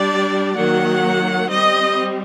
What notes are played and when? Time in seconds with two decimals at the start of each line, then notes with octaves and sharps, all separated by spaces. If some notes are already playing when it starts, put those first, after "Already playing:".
Already playing: G3 D4 D5
0.56 D#3 F#3 A#3 F#5
1.49 G3 C4 D#5